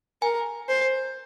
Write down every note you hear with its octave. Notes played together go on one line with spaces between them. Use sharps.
A#4 G#5
C5